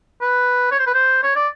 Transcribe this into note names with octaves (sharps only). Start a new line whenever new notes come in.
B4
C#5
C5
B4
C5
C#5
D5